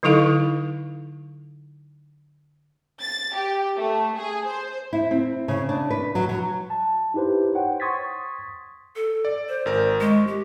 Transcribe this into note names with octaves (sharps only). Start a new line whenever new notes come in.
D3 F#3 D#4 E4 A4 F5
A6
G4
A3
G#4
C5
E4
C4
C#3
D4
B4
F#3
F#3
A5
D#4 E4 G4 B4 C5
C5 C#5 F#5 G5
C6 C#6 D#6 G#6 A6 B6
A4
D5
C5
G#1 A#4
G#3 C#6
G4